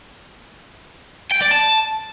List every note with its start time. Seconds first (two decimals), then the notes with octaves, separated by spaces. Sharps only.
1.31 G5
1.41 D5
1.51 A5